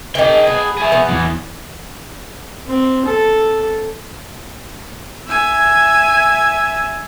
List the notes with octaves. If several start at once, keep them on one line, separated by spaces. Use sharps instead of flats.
D#3 E3 G#4 G5
B3
G#4 E5
B3
E2 E3
C4
A4
E5 G#5